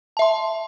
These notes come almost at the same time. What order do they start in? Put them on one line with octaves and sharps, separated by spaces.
A5 E5 C6